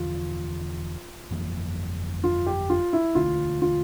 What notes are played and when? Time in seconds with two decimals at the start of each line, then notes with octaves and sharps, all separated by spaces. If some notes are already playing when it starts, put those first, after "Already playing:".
Already playing: E1 E2 D3 F3 F4
1.30 G1 F2 E3 A#3
2.24 F4
2.46 G4
2.70 F4
2.93 E4
3.15 E1 D2 D3 A3 F4
3.62 F4